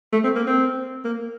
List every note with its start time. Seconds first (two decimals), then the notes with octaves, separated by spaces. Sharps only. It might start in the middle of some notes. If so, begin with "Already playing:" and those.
0.13 A3
0.24 C4
0.36 A#3
0.47 C4
1.05 A#3